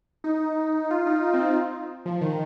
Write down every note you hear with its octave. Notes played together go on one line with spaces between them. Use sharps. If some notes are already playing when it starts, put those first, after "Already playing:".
D#4
F4
D#4
D#4
C4
C4
F3
D#3